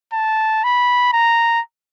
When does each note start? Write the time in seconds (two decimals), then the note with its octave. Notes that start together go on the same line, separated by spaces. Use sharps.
0.13 A5
0.64 B5
1.13 A#5